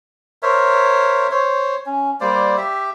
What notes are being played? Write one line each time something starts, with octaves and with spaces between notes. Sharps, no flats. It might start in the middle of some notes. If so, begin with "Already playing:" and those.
A#4 C5 C#5 E5
C5 C#5
C#4
G3 A#3 C5 D5
G4 E5